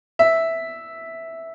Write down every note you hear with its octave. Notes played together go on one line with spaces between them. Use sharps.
E5